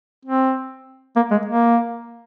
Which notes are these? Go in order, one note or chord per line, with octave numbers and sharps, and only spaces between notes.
C4
A#3
G#3
A#3